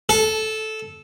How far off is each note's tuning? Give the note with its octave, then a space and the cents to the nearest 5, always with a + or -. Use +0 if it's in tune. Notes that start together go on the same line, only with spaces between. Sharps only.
A4 -10